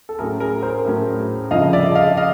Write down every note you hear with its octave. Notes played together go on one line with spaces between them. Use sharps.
A4
A2 F#3 A3 C#4 G#4 A#4
G#4 A#4
A#4 C5
A2 F#3 A3 C#4
G1 F2 C#3 F3 D#5 F5
D5 E5
D#5 F5
D#5 F5